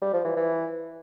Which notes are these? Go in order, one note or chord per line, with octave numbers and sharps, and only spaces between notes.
G3
F3
E3
E3